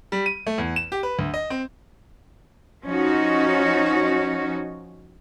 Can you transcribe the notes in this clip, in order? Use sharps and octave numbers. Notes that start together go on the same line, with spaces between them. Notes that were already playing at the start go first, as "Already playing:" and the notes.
G3
D#7
A3
E2
E7
G4
B4
D2
D#5
C4
F3 C#4 D#4 F#4